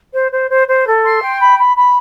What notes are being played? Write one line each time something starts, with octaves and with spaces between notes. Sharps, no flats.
C5
C5
C5
C5
A4
C6
G5
B5
B5
B5